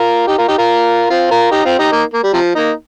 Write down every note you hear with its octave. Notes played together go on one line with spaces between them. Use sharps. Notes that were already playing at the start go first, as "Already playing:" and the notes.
Already playing: F4 A#4
D#4 G4
F4 A#4
D#4 G4
F4 A#4
C4 F4
F4 A#4
D#4 G4
C4 F4
D#4 G4
A#3 D#4
A#3
G3
C3 F3
A#3 D#4